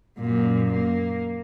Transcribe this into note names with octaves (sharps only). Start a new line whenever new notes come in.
F#2 A#2
A#3